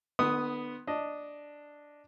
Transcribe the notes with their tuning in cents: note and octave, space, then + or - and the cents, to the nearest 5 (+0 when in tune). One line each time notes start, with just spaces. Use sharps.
D3 +45 B3 +0 D#6 +0
D4 +0 D#5 +0